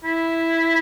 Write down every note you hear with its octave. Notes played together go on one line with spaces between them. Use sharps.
E4